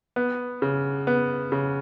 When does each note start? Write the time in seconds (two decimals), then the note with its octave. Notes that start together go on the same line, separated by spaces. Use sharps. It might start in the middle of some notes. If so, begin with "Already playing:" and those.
0.16 B3
0.62 C#3
1.07 B3
1.52 C#3